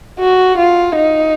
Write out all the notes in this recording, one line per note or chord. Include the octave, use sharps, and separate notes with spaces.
F#4
F4
D#4